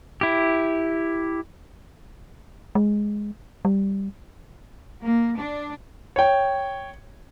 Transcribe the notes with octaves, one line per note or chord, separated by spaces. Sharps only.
E4 G4
G#3
G3
A#3
D4
C#5 G5